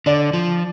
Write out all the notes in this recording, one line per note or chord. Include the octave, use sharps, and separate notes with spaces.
D3 D5
F3